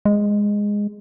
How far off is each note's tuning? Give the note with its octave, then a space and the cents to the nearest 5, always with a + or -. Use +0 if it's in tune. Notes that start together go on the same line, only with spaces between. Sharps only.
G#3 -10